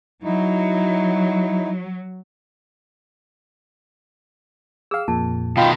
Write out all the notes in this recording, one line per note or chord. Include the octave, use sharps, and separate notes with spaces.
F#3 D#4 E4
G#4 F5 G5 E6
F2 A#2 A5
B2 D#3 F4 D#5 F5 G5 B5